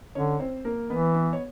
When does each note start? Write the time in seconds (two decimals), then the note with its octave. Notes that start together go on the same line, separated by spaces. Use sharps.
0.15 D3 C#4 C#5
0.40 C4 C5
0.65 A#3 A#4
0.89 E3 B3 B4
1.14 B3 B4
1.33 C#5